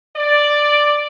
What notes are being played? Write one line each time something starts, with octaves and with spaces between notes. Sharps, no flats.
D5